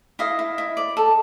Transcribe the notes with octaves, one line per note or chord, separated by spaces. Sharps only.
E4 D#5 F5
E4
E4
D5
A4